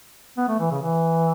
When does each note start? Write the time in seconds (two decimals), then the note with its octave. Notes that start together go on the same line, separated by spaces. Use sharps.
0.38 B3
0.48 A3
0.60 E3
0.71 C#3
0.82 E3